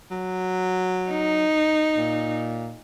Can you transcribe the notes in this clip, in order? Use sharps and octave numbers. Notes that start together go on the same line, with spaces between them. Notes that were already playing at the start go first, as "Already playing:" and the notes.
F#3
D#4
A#2